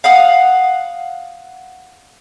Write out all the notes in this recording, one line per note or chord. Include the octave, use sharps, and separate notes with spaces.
F5 F#5 D#6